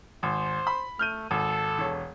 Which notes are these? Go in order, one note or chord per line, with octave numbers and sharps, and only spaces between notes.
G#1 C5
B5
A3 F6 G6 D#7
G#1 A4
E1 C#5